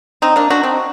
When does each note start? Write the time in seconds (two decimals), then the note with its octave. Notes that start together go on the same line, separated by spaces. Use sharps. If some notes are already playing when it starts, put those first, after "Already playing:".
0.22 C4 D#4
0.36 A#3 D4
0.50 D4 F#4
0.63 C4 D#4